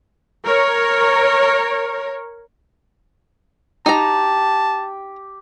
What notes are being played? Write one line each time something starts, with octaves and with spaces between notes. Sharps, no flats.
A#4 C#5
D#4 G4 A5 A#5